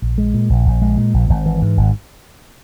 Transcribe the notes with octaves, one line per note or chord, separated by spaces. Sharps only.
A#1
G#3
A#2
A#1
A#1
G#3
A#2
A#1
G#1
E3
G#2
G#1